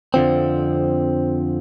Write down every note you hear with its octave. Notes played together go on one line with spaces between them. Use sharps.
F2 D3 F3 C4